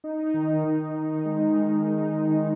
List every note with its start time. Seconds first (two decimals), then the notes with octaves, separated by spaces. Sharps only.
0.04 D#4
0.34 D#3
0.64 D#3
0.95 D#3
1.25 G#3
1.55 D#3
1.86 G#3
2.16 D#3